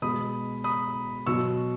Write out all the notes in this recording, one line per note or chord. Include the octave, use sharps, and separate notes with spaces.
B2 G#3 B5 D#6
B5 D#6
B2 F#3 C#6 E6